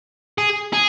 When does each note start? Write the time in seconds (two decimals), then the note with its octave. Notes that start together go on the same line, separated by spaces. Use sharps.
0.38 G#4
0.73 G#4